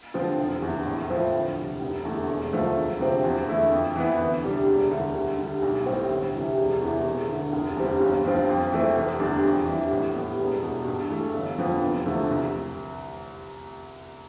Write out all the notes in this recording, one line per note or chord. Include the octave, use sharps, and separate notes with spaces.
D3 F3 C4 F4
F1
E2 D3
A2
F3 C4 E4
D2
C3 G3
F1
E2 D3 A3
E1
D2 D3 F3 A3
E1
D2 C3 F3 C4
E2
D3 A3 E4
F2
E3 B3
D2
C3 G3 D4
E1
D2 D3 G3
D2
D3 G3
B1
A2 G3 C4
D2
C3 E3 G3
E1
E2 C3 E3
E1
D2 D3
F1
E2 D3 G3 C4
G1
G2 F3 C4 F4
F2
E3 A3 C4
F1
E2 D3 G3 D4
F2
E3 G3 D4
A2
G3 B3
E1
E2 B2 G3
G2
E3 A3
G1
F2 D3 F3 B3
F1
E2 D3 F3 A3
C2